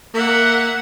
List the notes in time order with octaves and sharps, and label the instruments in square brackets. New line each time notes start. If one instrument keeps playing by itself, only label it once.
[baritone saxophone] A#3 [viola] E5 F#5